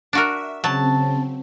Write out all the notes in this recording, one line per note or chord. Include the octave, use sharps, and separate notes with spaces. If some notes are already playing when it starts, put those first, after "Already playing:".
D4 F#4 A#4 E5
C#3 F#3 C4 A5